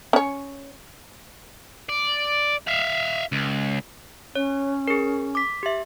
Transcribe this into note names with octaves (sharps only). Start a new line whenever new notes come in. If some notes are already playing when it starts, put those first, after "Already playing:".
C#4 C#5
D5
E5 F5
C#2
C#4 C#5
G#4 A#4
D6 B6
G4 E5